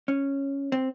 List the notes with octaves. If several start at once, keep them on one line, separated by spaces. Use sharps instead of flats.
C#4
C4